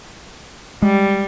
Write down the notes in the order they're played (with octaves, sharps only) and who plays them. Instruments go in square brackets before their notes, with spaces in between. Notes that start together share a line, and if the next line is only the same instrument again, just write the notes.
[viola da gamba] G3 [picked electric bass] G#3